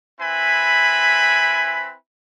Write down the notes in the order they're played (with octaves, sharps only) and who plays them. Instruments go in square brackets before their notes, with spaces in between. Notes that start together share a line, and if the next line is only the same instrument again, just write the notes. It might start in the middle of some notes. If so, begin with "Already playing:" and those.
[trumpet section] C4 E4 B4 G#5 B5